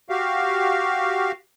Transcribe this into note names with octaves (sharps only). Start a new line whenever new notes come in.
F#4 G4 F5